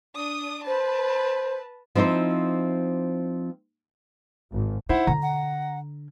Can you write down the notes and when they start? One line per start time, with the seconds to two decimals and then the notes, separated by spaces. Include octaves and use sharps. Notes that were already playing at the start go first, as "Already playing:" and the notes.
0.15 D4 D#6
0.67 B4 C5 A5
1.95 F3 C4 D#4 E4 C5
4.52 G#1
4.89 D#4 E4 C5 F#5
5.07 D3 A#5
5.23 F#5